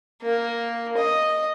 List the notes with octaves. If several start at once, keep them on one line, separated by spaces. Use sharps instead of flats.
A#3
D#5